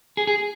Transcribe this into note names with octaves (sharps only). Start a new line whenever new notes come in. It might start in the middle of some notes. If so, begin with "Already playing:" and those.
G#4
G#4